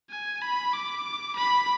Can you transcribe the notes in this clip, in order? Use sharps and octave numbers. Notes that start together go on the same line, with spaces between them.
G#5
B5
D6
B5